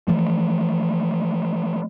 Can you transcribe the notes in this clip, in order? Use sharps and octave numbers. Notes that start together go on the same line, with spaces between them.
E3 F3 A3